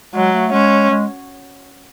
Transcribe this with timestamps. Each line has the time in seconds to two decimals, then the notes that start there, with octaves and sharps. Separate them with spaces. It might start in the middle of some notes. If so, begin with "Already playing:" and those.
0.14 F#3 G#3
0.34 A3
0.53 G#3 C#4
0.90 G#3